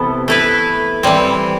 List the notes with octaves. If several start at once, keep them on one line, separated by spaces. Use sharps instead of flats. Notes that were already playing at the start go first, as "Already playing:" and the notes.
Already playing: C3 E3 B3 A4
A3 E4 B4
E3 G3 C4